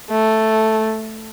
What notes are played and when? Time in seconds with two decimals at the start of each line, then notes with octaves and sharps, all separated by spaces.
0.11 A3